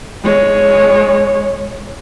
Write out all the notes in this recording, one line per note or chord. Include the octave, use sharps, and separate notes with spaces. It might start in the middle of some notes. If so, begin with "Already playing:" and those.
G#3 C#5